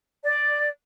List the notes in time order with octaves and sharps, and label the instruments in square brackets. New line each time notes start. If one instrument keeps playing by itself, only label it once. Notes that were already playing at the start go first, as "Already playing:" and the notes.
[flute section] D5